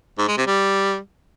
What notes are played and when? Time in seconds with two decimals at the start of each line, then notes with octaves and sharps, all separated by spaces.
0.19 G#2
0.28 G#3
0.37 C3
0.47 G3